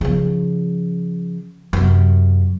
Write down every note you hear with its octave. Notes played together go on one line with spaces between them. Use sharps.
C#3 F3
F#2 C3